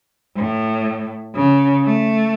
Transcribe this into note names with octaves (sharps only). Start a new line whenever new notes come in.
A2
C#3
A3